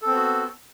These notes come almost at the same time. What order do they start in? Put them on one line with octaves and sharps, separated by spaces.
A4 C4 B3 F#4